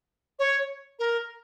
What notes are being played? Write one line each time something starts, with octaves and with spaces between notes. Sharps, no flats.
C#5
A#4